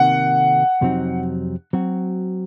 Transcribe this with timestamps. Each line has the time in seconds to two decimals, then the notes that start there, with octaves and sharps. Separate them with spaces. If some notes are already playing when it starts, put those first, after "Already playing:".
Already playing: C3 D#3 A#3 F#5
0.81 F2 C3 F#3 C4 D#4
1.73 F#3 C4 F#4